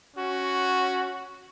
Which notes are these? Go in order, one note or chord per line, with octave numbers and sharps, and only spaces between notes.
C#4 F#4